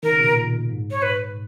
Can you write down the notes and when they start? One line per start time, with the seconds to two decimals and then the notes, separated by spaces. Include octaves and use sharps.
0.03 D#3 A#4
0.11 C#3
0.20 B2
0.28 A#2
0.69 G#2
0.91 C#5
1.02 B4